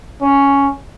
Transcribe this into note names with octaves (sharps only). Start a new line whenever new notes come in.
C#4